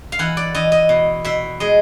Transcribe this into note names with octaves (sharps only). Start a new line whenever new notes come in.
F5
E3 F#5
D5
E3 D#5
D#5
B2
B2 E5
G#3 D#5